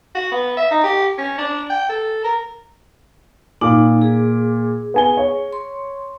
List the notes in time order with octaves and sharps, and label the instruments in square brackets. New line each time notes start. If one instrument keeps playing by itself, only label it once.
[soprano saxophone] F#4
B3
E5
D#4
G4
C#4
D4
G5
A4
A#4
[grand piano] A#2 D6 [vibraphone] D#4
[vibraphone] G#4
[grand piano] B3 G#5 G7
C#5
[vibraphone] C6